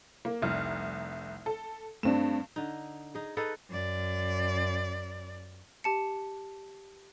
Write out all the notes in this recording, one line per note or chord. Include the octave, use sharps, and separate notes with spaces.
A#3
F1 C2 F6
A4
G2 A3 C4 D4 E7
D3 D#4
D#4 G#4
D#4 G#4 A4 B4
F#2 D5
G4 A5 C#7